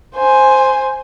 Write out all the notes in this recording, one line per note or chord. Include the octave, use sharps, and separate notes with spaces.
C5 G#5